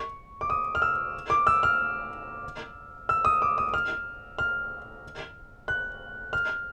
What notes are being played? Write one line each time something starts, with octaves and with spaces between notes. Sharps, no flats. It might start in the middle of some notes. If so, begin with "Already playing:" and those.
Already playing: C#6
D6
D#6
F6
E6
D6
E6
F6
E6
D#6
D6
D#6
F6
F6
F#6
F6